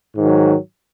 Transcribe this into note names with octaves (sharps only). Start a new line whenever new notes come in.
G#2 D#3 F#3